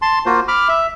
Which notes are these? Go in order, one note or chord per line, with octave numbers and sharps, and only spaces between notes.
A5 C6
A#3 F4 F#4 C5
B5 D6 F6
E5